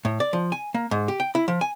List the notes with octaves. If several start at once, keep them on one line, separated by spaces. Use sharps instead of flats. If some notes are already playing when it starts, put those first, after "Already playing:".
A2
D5
F3
G#5
A#3
G#2
G4
G5
E4
F3
G#5